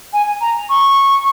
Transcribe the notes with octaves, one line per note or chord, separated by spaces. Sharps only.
G#5
A#5
C#6